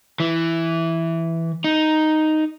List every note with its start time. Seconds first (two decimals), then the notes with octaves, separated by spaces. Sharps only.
0.20 E3
1.64 D#4